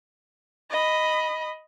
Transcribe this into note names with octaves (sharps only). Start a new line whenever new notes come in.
D#5 B5